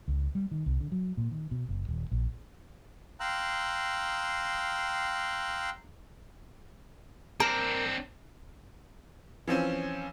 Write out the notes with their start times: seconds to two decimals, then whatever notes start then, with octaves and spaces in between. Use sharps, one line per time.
0.08 C#2
0.35 G3
0.51 D#3
0.66 C2
0.81 D3
0.92 F#3
1.17 A#2
1.31 D#3
1.51 B2
1.69 F#1
1.89 D#1
2.11 A#1
3.20 F5 G5 A#5 C6 E6 F#6
7.40 C4 D4 A#4
9.48 E3 F3 C4 C#4